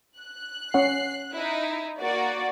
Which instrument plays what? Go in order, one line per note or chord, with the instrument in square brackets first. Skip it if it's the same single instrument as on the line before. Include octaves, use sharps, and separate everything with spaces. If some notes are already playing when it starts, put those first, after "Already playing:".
[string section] F#6
[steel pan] C#4 C#5 F#5 [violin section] C7
[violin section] D#4 E4
[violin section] A#3 [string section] F#4 D5